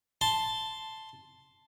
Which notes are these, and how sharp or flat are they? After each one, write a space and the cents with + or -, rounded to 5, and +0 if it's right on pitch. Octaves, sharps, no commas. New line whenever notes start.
A5 +0 C6 +0